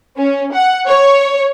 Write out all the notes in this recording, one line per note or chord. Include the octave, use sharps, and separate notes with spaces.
C#4
F#5
C#5